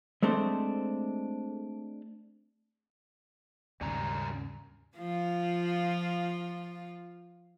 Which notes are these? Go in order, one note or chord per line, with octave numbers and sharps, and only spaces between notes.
G#3 A3 C4 D4 A4 C5
D#2 G#2 C#3 G3 C#4 A#5
F3 F4